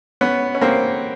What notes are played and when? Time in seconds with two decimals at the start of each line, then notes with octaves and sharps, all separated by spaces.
0.21 B3 C#4
0.55 C#4
0.61 A#3 C4